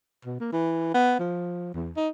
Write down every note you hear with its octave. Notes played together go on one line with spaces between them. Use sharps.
B2
A#3
E3
B3
F3
E2
D#4